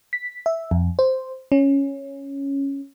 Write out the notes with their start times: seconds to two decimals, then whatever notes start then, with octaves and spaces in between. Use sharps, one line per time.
0.13 B6
0.46 E5
0.71 F2
0.99 C5
1.52 C#4